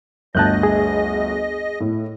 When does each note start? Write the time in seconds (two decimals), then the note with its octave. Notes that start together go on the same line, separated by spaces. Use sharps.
0.35 G1 D2 D#5 A5 F#6 G6
0.63 G#4
1.80 A2